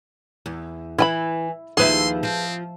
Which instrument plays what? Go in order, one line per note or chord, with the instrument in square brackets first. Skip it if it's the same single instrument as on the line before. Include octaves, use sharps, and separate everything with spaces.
[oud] E2
[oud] E3 [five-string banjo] E4 G#5 B5
[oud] D#2 F3 E4 [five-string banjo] G#4 B4 [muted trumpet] C6
[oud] F3 [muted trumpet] C4